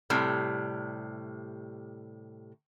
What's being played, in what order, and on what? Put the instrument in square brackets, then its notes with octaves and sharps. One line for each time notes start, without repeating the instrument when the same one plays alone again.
[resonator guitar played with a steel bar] A2 C3 G3